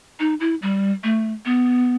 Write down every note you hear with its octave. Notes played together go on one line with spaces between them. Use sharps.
D#4
E4
G3
A3
B3